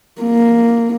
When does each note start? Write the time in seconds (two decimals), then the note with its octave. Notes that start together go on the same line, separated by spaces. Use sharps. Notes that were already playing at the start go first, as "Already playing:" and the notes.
0.22 A#3